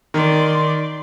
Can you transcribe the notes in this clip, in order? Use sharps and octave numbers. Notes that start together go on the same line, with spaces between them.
D#3 D5 C6